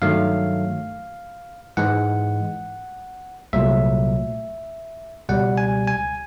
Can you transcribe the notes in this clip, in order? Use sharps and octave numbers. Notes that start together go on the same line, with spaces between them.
G2 D#3 F#3 A3 F5
G#2 E3 G#3 F#5
C2 A#2 F#3 A3 E5
C#2 B2 G3 F#5
G#5
G#5